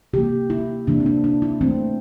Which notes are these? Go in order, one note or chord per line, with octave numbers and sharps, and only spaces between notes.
C3 E3 A#3 G4
E4
C3 E3 A#3 D4
C4
D4
D4
E4
E3 A3 C4